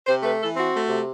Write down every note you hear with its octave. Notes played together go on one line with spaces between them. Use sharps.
C3 C5
A3 B4
E3 A4
C4 F#4
A3
C3